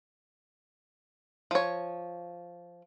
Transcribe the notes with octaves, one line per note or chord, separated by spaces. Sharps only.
F3 C#5